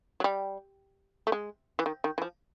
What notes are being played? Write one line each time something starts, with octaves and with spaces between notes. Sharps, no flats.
F#3
G3
A3
G#3
E3
D#3
D#3
E3
F3